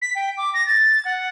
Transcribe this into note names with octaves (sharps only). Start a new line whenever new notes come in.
B6
G5
D6
A#6
A6
F#5